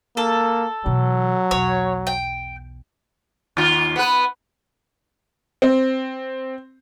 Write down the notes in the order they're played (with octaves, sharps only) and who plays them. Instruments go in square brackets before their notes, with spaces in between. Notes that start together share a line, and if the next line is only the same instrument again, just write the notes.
[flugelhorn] A#3 [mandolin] A4
[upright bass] B2 E3 [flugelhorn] F#3
[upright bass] B1 E2 [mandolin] C#5
[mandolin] G5
[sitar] D#2 F4
B3 B4
[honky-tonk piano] C4